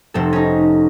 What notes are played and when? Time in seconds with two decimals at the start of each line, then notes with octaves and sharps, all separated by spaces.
0.14 F1 C4 A4
0.33 C#4 D#4